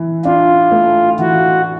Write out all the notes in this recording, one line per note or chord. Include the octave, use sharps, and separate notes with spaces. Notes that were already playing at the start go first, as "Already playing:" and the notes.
Already playing: E3
D4 F4
A3
E3 F#4